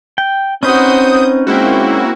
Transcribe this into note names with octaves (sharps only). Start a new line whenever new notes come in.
G5
C4 C#4 D#4 F#4 B4 C5 D#6 G6
G#3 A#3 C4 E4 F#4